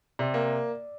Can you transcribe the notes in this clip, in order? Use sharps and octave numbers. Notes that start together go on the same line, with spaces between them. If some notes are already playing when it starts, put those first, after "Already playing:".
C3 D5
A#3